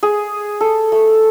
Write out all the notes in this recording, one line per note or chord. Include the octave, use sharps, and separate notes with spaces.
G#4
A4
A3